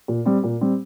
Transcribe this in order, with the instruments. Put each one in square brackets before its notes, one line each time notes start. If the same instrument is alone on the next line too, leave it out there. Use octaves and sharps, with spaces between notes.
[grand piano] A#2
G3 C4
A#2
G3 C4